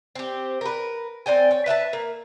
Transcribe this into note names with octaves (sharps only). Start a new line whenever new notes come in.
C4 G4
A#4 B4
C4 D5 G5 G#5
C#5
B4 E5 G#5 A5
A#3